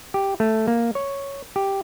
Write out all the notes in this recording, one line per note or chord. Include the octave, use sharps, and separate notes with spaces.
G4
A3
A#3
C#5
G4